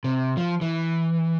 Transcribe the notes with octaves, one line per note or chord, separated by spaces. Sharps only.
C3
F3
E3